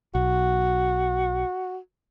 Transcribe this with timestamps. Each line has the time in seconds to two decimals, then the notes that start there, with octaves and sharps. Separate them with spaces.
0.15 B1 F#4